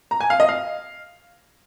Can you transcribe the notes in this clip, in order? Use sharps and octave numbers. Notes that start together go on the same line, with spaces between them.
A#5
G#5
F5
D#5
F5